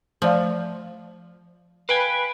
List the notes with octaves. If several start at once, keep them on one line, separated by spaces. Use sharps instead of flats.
F3 A3 D5 F5
B4 F5 G5 G#5